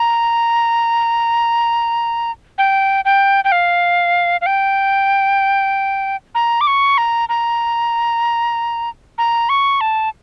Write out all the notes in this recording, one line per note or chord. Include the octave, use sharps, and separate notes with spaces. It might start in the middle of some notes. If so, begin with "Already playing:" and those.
Already playing: A#5
G5
G5
G5
F5
F5
G5
A#5
D6
C#6
A#5
A#5
A#5
C#6
A5